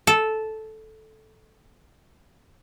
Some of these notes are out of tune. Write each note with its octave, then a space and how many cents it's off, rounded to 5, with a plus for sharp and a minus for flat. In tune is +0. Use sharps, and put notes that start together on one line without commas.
A4 -10